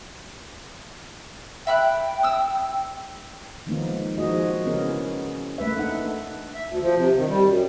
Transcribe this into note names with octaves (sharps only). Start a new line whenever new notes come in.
E5 G5 B5 F#6
D#6 E6
D#3 F3 G#3 A#3 B3 D#4
F3 A#3 D#4 F#4 G#4 D#5
C#3 E3 B3 C#4 G#4 A#4
A3 A#3 B4 E5
A#3 D4 D#4 F#5
E5
D2
F3
C3
D#3
G3
F#2